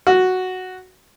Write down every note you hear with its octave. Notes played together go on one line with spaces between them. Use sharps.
F#4